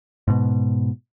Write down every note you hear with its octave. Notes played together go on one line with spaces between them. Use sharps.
G#2 B2